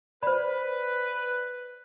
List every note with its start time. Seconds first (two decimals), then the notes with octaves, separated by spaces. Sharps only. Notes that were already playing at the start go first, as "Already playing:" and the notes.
0.23 B4 C5 D5 B5